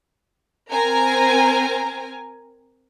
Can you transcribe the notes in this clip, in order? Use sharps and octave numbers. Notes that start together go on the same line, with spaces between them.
C4 A#4 G#5 A#5